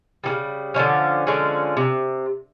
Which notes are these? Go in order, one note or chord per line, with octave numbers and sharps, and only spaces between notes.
C#3 E3 G3
D3 F3 G#3 C#4
D3 F3 G#3 C#4
C3